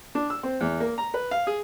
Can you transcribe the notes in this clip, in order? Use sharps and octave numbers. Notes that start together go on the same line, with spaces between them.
D4
E6
C4
E2
A#3
A#5
B4
F5
G#4